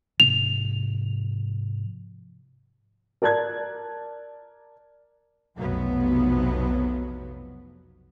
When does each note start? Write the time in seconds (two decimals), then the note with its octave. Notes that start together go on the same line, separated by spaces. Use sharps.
0.20 G#2 C3 F3 F7
3.22 A#4 D5 A5 F#6 G#6
5.58 F1 B1 C3 F3 F#3 B3